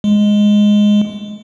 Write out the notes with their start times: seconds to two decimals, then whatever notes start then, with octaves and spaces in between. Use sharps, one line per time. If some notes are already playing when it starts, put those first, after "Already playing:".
0.04 G#3